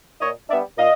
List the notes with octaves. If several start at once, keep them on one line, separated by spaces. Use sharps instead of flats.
A#2 C#5 D#5
G3 B3 D4 D5 E5
A#2 D#5 F5